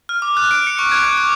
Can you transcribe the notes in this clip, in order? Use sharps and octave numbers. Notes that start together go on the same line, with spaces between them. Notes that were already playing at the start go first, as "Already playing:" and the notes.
F6
D6
F#6
D7
C#7
C#6
G#6
F#6
D6